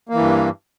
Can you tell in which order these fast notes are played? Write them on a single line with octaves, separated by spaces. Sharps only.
A#3 E3 G2